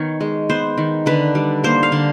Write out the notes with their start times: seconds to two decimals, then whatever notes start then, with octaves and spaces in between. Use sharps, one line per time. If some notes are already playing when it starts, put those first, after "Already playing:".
Already playing: D#3 B3 C#5
0.21 G#3
0.49 B3 C5
0.78 D#3
1.06 D3 B4
1.35 G3
1.64 A#3 C5
1.83 F5
1.92 D3